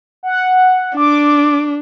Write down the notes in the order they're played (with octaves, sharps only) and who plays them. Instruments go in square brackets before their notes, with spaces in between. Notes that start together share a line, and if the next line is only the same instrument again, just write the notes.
[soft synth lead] F#5
[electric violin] D4 [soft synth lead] D6